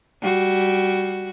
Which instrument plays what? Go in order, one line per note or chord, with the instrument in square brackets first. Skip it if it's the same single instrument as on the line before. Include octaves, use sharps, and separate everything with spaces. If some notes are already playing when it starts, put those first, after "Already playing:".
[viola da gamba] G3 F#4